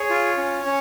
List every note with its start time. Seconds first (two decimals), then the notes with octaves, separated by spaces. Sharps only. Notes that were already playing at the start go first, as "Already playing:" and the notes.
Already playing: G#4 C#5
0.10 F4
0.37 C#4
0.65 C#4